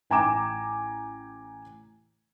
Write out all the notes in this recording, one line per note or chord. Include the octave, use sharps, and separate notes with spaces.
A1 G5 G#5 A#5 D6 E7